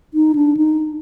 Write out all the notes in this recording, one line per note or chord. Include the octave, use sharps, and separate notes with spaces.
D#4
D4
D#4